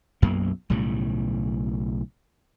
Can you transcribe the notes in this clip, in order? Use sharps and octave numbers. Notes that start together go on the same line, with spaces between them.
B1 F#2 A#3
B1 A2 C#3 G3